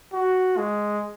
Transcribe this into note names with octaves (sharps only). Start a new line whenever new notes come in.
F#4
G#3